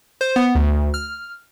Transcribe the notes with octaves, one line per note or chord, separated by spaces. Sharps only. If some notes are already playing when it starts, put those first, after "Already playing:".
C5
B3
D2
F6